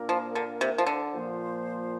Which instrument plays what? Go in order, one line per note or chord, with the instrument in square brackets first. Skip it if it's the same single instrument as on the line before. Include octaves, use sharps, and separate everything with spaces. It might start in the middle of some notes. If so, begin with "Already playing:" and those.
Already playing: [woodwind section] A#2 A#3 D4 A#4
[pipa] F3
D3
C3
F3
D3
[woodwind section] A#2 F3 A#3 F4 C5